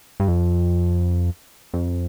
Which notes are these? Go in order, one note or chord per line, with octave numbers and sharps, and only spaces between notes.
G2
F2
F2